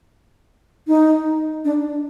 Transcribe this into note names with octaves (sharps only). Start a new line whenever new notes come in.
D#4
D4